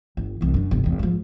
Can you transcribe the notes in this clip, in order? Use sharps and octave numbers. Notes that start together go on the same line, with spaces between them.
G1
C2 E3
F#2 D4
G1 C3
G#1 E2
G#2 F3